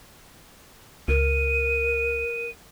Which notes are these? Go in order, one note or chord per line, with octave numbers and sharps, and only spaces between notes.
C#2 A#4 D#7